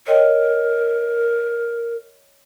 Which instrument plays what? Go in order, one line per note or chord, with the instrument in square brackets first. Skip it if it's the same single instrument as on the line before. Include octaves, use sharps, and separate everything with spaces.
[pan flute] A#4 [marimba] C#5 D#5 G5